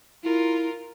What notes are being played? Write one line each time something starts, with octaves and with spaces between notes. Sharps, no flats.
E4 F4 A#4